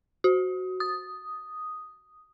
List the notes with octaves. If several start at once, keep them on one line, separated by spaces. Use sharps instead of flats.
F#4
D#6